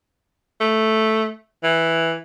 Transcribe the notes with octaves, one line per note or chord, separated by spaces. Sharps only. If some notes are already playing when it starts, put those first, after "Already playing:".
A3
E3